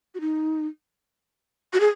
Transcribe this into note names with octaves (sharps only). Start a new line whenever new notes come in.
F#4
D#4
F#4
G#4